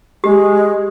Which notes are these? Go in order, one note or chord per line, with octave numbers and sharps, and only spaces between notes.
G#3 G4